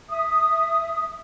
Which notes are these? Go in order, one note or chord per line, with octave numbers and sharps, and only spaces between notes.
E5 D#6